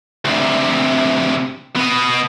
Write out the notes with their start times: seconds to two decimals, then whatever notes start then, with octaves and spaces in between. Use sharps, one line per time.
0.25 D2 C3
1.76 B3 D#5